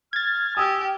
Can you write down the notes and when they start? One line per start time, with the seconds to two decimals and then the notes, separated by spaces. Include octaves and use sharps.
0.13 F6 G#6 A6
0.57 G4 G#5 D#6 E6